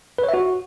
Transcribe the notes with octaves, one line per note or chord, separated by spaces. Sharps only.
B4
C#5
E5
F#4